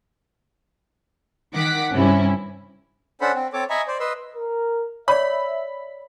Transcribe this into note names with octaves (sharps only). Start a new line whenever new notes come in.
D#3 F#5 D6 B6
G2 C3 C#4 E4
C#4 D4 A4 C5 F#5 B5
C4
C4 A4 C#5 D6
D#5 E5 G#5 A#5 B5 C#6
C5 D5
B4 D#5 C6 E6
A#4
C#5 D5 E5 B5